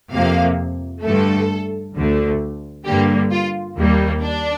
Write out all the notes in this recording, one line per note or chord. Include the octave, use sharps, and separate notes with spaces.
F2 C3 F3 A#3 F5
G2 D3 A3 A4
D2 D3 A3
G2 D3 G3 A#3 G4
F4
D#2 D#3 G3 A#3
D4